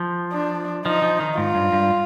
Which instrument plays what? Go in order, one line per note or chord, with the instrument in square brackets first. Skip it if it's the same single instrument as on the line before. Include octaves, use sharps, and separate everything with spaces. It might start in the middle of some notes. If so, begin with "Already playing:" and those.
Already playing: [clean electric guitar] F3
[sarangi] D4
[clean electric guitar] F3 [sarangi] D#4
[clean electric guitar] F3
D#3
[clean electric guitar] G#2 [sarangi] F4
[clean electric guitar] G2
G2